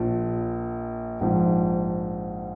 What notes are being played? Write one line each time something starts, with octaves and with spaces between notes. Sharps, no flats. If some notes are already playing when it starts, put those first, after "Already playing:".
Already playing: A#1 A#2 F3
A#1 G#2 F3